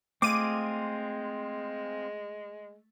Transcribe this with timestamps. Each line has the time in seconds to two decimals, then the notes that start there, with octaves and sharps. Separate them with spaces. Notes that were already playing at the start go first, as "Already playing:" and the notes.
0.22 G#3 A3 C4 F4 G#4 D6 D#7